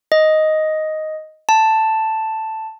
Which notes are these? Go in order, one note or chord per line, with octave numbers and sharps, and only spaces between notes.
D#5
A5